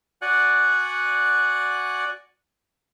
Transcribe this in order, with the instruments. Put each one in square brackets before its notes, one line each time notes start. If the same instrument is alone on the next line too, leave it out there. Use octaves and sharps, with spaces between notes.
[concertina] F#4 D5 F#5 G#5 F#6